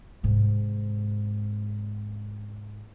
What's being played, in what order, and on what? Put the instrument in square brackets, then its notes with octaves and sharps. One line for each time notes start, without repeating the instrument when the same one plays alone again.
[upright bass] G#2 C3